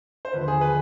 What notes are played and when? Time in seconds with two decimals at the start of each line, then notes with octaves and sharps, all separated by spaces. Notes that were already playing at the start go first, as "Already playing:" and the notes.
0.25 C5
0.33 D#2 D3 F3 B4
0.48 G#4
0.61 B4